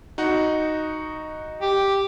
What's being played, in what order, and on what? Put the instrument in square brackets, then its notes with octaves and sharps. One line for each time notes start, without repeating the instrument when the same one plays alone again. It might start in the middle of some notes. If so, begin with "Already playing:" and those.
[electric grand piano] D#4 F#4 F#5
[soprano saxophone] G4